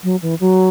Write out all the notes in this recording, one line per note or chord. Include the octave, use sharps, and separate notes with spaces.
F#3
E3
F#3